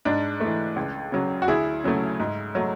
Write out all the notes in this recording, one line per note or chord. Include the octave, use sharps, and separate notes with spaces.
G#2 D4
E3 A3
C#2
C#3 F#3
F#4
D2 E4 G#4
C#3 F#3 A3
G#2
F#3 A3